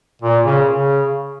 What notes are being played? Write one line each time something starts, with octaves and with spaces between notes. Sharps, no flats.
A#2
C#3
C#3